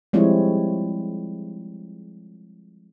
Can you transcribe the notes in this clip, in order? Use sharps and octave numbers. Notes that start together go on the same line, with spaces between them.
F3 G3 G#3 C4 E4 C#5